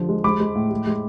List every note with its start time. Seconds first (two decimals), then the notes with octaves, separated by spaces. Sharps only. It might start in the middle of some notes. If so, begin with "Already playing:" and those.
Already playing: D3 F3
0.09 G#3
0.24 G#3 B5 D6
0.40 G#3
0.55 A2
0.71 G#3
0.87 G#3